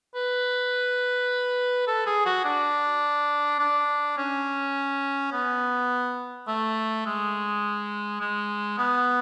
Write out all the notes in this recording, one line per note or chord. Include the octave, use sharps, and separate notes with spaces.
B4
A4
G#4
F#4
D4
D4
C#4
B3
A3
G#3
G#3
B3